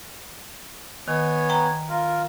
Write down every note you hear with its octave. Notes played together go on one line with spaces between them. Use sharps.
D#3 B3 C#5 G#5
G5 A#5
F4 A#4